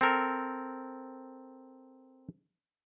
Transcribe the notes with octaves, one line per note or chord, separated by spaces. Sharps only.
C4 A4 A#4